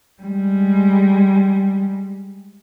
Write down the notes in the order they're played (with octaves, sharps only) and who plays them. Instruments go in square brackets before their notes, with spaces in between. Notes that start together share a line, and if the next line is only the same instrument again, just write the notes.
[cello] G3 G#3